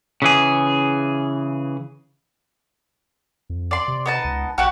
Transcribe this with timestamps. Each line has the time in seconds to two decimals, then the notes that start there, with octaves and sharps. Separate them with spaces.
0.22 C#3 E3 G#4
3.50 F2
3.71 D5 C6
3.88 C3
4.06 B3 D#4 A5
4.24 C#2
4.58 A#1 F#4 G4 F#5